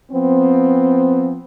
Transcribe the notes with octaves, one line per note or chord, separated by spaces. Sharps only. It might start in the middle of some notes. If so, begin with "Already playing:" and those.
F3 B3 C4